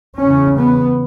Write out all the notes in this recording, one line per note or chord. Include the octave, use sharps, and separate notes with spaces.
E2 C#3 C#4
B3